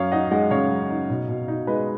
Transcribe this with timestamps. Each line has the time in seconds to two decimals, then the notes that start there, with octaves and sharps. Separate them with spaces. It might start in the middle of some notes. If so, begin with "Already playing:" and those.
Already playing: F#2 C#5 F5
0.12 D#4 D#5 F#5
0.31 G#3 D#5 F#5
0.51 C#3 C#5 F5
0.70 F#2
0.90 D#4
1.09 B2
1.28 B2
1.48 D#4
1.67 G#3 B4 D#5